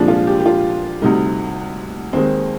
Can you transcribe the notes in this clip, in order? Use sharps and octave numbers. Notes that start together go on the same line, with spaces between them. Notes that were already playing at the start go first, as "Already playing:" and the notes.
Already playing: C2 A#2 F3 G#3 D4
F4
G4
G4
F4
D2 C3 G3 D#4
D#2 D#3 G#3 C4